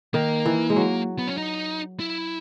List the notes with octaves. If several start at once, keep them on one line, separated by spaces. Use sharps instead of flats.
D#3 A#3
E3
G#3
F#3
B3
C#4
D#4
E4